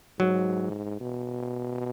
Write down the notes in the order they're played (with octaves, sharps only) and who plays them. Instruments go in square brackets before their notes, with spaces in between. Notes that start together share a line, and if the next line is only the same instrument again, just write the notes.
[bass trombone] G#2 [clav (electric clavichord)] F#3
[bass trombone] B2